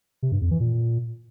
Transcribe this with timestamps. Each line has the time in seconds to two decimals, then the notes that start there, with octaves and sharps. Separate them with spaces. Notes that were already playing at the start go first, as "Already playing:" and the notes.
0.23 C3
0.32 G2
0.41 F2
0.51 E3
0.60 A#2